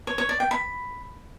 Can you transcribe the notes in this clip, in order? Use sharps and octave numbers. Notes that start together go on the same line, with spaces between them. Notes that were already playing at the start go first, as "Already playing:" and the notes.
C#5
C#5
D5
G5
B5